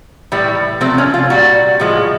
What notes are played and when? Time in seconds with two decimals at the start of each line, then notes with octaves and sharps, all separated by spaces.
0.32 A2 E3 G3
0.81 C3 F3 A3 C4
0.98 C#4
1.14 F4
1.30 A#2 G3 F#4
1.80 A2 F3 G#3